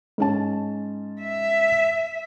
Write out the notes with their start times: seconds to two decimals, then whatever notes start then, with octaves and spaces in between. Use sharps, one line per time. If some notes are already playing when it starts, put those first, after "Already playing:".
0.18 G#2 C#4 A5
1.22 E5